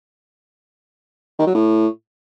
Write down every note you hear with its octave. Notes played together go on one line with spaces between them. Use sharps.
D#3
F#3
A2